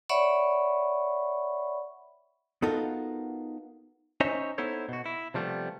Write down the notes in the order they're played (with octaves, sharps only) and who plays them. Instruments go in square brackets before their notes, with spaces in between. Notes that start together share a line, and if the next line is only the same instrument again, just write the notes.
[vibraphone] C#5 D5 E5 F#5 B5 C#6
[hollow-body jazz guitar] B3 D#4 F4 F#4 A4 A#4
[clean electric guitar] C#4 D#4 C5 C#5 D#5 E5
B3 D#4 E4 A4 C5 C#5
B2 F#4
E4
C3 F3 G3 A3 B3